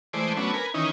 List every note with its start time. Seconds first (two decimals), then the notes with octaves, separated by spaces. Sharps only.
0.13 E3 G#3 A3 C5 D5
0.37 F#3 A3 B3 C#4 D4
0.54 A#4 B4 G#5
0.74 D#3 E3 C#4 D#4